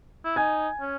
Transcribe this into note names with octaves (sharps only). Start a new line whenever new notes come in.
E4
D#4 G#5 G#6
C#4